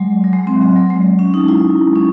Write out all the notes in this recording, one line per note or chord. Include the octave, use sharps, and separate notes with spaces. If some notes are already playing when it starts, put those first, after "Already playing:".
Already playing: F#3 G#3
F#3
G#3
C4
G#3
F#3
G#3
C#4
D#4
E4
C#4